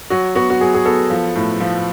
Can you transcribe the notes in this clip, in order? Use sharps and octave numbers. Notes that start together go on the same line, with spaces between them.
F#3 F#4
B3 F#4
F#4
F#3 G#4
G#4
B3 A4
F3
A2
F3